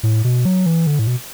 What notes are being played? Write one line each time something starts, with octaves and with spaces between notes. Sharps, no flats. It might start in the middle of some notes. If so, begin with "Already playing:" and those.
A2
B2
F#3
E3
D3
A2
B2